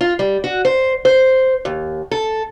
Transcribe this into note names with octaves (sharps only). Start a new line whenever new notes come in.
F4
G3
F#4
C5
C5
D#2
A4